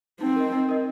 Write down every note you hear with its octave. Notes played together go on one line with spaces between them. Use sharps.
C4 D#4
A#4 D#5
D#4
A#4 D#5